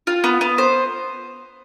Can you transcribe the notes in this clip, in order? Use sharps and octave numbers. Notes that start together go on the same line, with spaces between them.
F4
B3
B3
C5